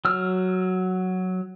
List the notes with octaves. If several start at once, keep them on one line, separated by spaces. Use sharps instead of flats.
F#3 E6 F6